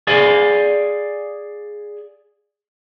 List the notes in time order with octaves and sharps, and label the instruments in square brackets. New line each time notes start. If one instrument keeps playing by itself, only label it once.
[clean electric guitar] G#4 D5 F5 G#5